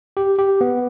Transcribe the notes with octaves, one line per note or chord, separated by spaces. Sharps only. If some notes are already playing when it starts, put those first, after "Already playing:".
G4
G4
B3